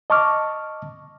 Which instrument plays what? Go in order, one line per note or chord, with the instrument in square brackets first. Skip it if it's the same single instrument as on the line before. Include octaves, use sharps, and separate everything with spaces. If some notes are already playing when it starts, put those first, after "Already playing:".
[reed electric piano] D#5 A5 C#6 D6 F6